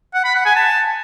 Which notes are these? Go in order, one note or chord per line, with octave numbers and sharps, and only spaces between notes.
F#5
B5
F#5
G#5
A5